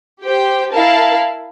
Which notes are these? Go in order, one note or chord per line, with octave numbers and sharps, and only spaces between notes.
G4 C5 G5
E4 A#4 F5 A5